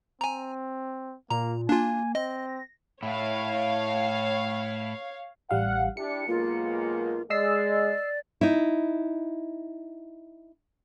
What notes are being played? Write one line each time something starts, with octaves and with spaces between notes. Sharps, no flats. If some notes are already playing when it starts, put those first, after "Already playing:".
C4 G#5 A#5
A#2 A#3 A#5
A#3 D4 F4 G#5
C4 D#5 A#6
A2 E4 C#5 F5
A1 G3 F5 F#5
D4 E4 G4 C#7
B1 G#3 A#3 F4
G#3 D5 D#5 E6 C7
D#4 E4